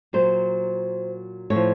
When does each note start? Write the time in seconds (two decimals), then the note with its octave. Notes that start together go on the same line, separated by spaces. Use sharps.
0.13 A#2 F#3 C5
1.50 A2 C#5
1.55 F3